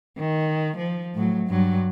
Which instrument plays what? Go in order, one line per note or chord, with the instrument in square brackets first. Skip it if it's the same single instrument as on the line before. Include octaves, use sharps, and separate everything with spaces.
[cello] D#3
F3
A2 F#3
G2 F#3